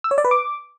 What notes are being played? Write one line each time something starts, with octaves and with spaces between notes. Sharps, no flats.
E6
C#5
D5
B4
D6